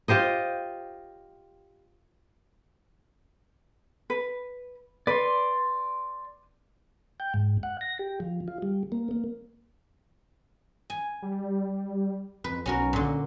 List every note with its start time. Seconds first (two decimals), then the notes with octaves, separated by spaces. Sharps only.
0.08 F4 G4 C5 D#5
4.10 B4
5.07 B4 D5 C6
7.20 G5
7.34 G#2
7.63 F#5
7.81 A#6
7.99 G4
8.20 F3
8.48 F4
8.62 G3
8.92 A#3
9.11 A#3
10.90 G#5
11.22 G3
12.44 F2 B4
12.66 B1 C#4 F#4 A#4
12.93 A#2 D3